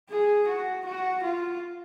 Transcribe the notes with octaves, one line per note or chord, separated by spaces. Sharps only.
G#4
F#4
F#4
F4